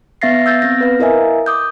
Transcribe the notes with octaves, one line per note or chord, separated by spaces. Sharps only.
B3 E5 F5 A6 A#6 C7
E6 G6 A6
B3 C4 A#6
B4 F5
E4 A#4 D#5 E5 G#5
D6 D#6 G6